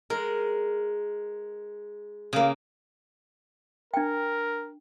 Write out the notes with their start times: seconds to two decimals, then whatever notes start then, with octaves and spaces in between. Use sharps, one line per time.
0.10 G#3 A#4
2.33 C#3 A#3
3.94 D4 A#4 G5